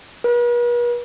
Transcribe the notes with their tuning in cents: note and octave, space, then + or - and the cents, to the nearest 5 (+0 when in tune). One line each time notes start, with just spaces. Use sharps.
B4 -45